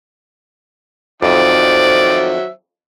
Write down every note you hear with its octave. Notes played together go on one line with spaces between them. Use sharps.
F2 D#3 F#3 C5 D5 E5